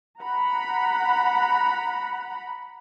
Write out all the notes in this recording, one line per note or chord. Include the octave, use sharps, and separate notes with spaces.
F#5 A#5 B5